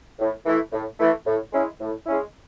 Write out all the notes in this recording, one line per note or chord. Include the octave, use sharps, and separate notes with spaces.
A2
E3 A3 E4
A2
E3 A3 E4
A2
G#3 C#4 E4
A2
G#3 C#4 E4